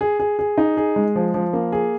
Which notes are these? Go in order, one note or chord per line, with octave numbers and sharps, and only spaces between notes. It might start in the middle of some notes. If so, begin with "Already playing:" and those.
G#4
G#4
G#4
D#4
G#4
G#3
F3
F3
A#3
G#4